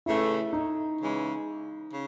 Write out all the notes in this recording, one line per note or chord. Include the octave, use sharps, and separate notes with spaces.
C#3 E3 A3 E4
D#4
C#3 E3 G#3
C#3